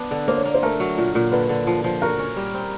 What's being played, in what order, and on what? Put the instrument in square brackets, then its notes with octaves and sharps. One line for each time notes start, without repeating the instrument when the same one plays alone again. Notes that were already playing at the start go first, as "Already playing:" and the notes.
Already playing: [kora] B3 D4
D3
[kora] A#3 [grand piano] C5
[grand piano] C#5
[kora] A#3 [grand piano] D5
[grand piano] C5
[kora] A3 [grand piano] A#4
[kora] F#3
A#2
A#2
[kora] D3 [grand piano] B4
[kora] D3
F3
F3
[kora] F#4 [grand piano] A#4
[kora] C#4
G3
C4